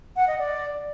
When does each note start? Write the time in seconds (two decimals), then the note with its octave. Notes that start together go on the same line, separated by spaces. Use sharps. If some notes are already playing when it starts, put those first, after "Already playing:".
0.16 F#5
0.27 D#5
0.38 D5